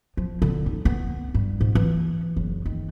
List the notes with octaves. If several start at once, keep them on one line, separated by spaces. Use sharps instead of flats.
F3
D3
D#4
B3
G2
G#2
E3
F#1
D#3